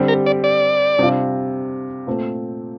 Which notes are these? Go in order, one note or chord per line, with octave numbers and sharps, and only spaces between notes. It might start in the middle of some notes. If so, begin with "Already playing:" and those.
Already playing: D3 G3 C4 G4
A#4
D5
D5
C3 G3 D4 F4
A#2 A3 C4